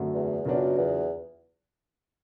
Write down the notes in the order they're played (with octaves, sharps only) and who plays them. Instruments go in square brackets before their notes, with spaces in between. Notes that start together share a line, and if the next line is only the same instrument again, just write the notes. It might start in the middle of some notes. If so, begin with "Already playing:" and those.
Already playing: [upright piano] F#2 D3 F#3 A3 C4
[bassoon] E2
[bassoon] F#2 [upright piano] C#3 F#3 B3 D4 F4
[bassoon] E2